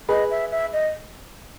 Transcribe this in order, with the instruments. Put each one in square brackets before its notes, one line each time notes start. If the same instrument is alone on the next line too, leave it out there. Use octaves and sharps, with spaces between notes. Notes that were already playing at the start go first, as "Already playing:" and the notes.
[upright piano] G#4 B4 [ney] D#5
[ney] E5
E5
D#5